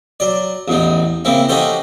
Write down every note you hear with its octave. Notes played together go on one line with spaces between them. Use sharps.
F#3 D5
A1 E2 D#4
C#3 A#3 C4 E4
C#4 D#4 F#4 G4 A4 C5